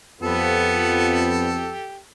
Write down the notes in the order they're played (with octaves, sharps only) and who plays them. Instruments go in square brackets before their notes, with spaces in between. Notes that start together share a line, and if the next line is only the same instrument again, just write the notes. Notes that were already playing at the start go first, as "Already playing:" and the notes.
[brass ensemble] F2 [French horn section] F3 B3 [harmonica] G4 A4